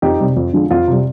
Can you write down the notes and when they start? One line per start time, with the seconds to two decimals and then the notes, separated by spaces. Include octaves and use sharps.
0.02 F2 D#4 G4
0.20 C3 G3
0.37 F2
0.53 D3 F3 G#3
0.71 F2 F4
0.88 C3 G3